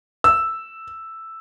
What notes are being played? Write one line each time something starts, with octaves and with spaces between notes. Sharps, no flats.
E6